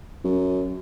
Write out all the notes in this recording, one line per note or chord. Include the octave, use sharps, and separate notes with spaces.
F#2